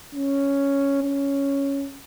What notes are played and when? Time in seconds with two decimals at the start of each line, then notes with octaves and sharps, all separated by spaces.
0.15 C#4
1.03 C#4